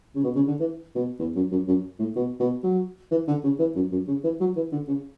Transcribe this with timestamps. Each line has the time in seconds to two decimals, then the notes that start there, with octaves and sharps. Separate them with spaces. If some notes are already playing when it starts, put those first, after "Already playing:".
0.15 C#3
0.24 B2
0.35 C#3
0.47 D3
0.60 E3
0.95 B2
1.19 E2
1.36 F#2
1.51 F#2
1.68 F#2
1.99 A2
2.16 B2
2.40 B2
2.63 F#3
3.11 E3
3.28 D3
3.44 C#3
3.59 E3
3.76 F#2
3.92 F#2
4.08 C#3
4.24 E3
4.40 F#3
4.56 E3
4.72 D3
4.88 C#3